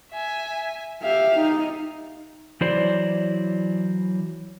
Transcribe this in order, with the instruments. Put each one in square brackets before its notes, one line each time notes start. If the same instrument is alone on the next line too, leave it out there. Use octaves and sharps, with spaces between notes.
[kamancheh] E5 G#5
[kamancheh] G4 F5 [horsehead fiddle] E5
[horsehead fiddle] D#4
[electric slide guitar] E3 F#3 E4 C5 D5